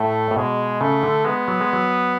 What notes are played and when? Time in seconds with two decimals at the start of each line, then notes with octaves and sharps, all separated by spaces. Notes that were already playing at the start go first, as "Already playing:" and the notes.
Already playing: A2 A3
0.31 A2
0.36 B2 G#3
0.81 C#3 A3
1.03 D3
1.25 G#3 B3
1.48 F#3
1.61 G#3
1.73 F#3